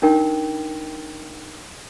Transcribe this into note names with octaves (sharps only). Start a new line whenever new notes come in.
D4 D#4 A#4 G5